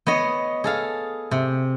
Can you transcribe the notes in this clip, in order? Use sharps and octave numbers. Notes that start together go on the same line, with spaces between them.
B3 C#5 D#5
G#4 A4 F5
C3